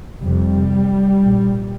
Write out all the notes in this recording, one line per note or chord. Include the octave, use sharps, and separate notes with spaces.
F1 F2 C3 G3
A#1 A#2